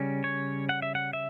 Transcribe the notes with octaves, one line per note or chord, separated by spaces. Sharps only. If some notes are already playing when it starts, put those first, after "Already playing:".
Already playing: C#3 G3 C#4
C#5
F#5
E5
F#5
E5